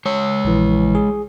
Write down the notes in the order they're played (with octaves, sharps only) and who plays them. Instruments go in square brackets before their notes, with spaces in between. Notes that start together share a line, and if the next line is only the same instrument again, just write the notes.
[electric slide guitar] G#3 C#5
[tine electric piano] A#1 E3
G#4